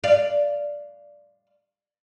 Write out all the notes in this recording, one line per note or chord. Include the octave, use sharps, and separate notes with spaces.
D5 F5